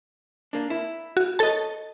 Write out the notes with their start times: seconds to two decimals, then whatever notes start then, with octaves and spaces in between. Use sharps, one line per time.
0.53 A#3 D4
0.70 E4
1.17 F#4
1.39 A4 C#5 D#5 A5